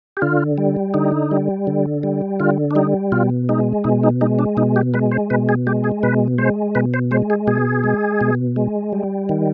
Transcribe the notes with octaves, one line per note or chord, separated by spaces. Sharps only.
G4
D3 F4
G3
D3 D#4
G3
D3
G3
D3 F4
D4
G3 D#4
B2 F4
G#3 D#4
B2 D#4
D#4
G#3 D#4
D4
B2 D#4
G4
G#3 B4
C5
B2 B4
G#4
G#3 G4
G#4
B2 B4
G#3 C5
B2 B4
C5
G#3 C5
G#4
B2 G#4
G#3
B2
G#3
G3
D#3